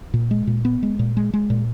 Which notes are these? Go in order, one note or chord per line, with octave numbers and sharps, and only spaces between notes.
A#2
G#3
A#2
B3
G#3
A#2
G#3
G#3
A#2